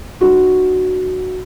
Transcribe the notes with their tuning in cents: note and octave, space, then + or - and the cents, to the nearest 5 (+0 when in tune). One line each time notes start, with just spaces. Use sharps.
D4 +40 F#4 +0